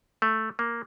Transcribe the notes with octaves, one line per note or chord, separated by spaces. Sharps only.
A3
A#3